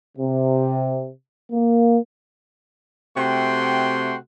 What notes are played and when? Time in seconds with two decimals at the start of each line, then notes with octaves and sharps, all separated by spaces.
0.18 C3
1.51 A#3
3.17 C3 A3 F#4 F#5 G5 C6